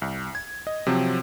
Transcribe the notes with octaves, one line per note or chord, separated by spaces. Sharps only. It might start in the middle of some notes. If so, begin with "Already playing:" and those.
C2
G#6
D#5
C3 F3 F#3 C4